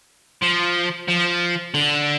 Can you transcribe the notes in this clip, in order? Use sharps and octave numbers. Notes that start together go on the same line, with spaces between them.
F3
F3
D3